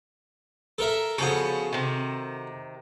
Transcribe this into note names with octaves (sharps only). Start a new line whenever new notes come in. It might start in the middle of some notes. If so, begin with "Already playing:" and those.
A4 A#4 E5
C#3 F3 B3 F#4 A4
C3 D#3